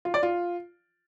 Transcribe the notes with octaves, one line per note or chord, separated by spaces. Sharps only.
F4
D5
F4